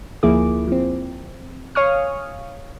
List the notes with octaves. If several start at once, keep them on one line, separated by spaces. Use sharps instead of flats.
D2 F3 A#3 E4 G#4 D6
F3 C4
C#5 F5 G#5 C#6 D#6 F6